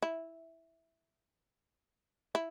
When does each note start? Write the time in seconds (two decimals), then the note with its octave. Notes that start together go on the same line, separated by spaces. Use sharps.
0.02 E4
2.35 E4